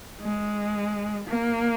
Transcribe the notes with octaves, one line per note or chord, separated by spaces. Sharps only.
G#3
A#3